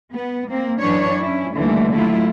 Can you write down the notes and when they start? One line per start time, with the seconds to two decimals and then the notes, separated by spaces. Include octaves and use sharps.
0.12 B3
0.49 A#3 C4
0.80 F#2 E3 F#3 D4 B4 C#5
1.21 C#4 E4
1.56 D#2 D3 E3 G3 A3
1.95 F#3 A3 E4 F4